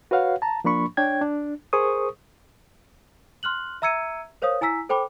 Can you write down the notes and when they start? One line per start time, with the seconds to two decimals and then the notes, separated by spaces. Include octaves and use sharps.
0.11 F#4 B4 C#5 F5 F#5
0.42 A5 A#5
0.64 F3 A#3 D4 B5 C#6
0.97 D4 C#5 G5 G#6
1.21 D4
1.73 G#4 A#4 C5 C#6 D#6
3.43 C6 F6 F#6 F#7
3.82 E5 A#5 E6 G#6 C#7 D#7
4.42 A#4 C5 C#5 F5 D#6
4.61 E4 G#5 A#5 E6 B6
4.89 A4 C5 G5 B5 D6